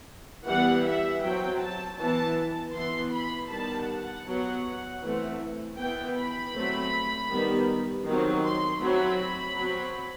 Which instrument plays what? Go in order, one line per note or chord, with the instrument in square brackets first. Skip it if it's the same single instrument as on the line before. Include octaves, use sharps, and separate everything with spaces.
[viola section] E3 G3 B3 F#5
E5
F#3 C4 G5
A5
E3 B3 A5
E3 B3 C6
B5
D#3 G3 B3 A5
F#5
F#3 B3
E3 A3 C4
E3 B3 G5
B5
F#3 A3 C4
D#3 G3 B3
D#3 F#3 C4
C6
F#3 A3 C4 B5
F#3 C4